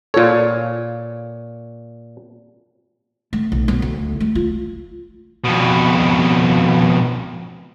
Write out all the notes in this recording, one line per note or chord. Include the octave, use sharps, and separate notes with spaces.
A#2 F4 A4 C#5
A3
B1
F#3 B3
D2
A3
F4
F2 B2